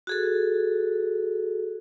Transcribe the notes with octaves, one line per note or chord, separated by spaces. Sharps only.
F#4 G#4 A4